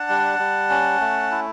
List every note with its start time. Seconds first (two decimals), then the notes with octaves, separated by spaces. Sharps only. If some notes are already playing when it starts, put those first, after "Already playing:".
Already playing: D4 F#5 A5
0.09 G3
0.39 G3
0.70 C#4
1.01 A3
1.31 E4